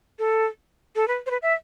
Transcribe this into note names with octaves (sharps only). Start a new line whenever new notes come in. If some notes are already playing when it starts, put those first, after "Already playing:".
A4
A4
B4
C5
B4
E5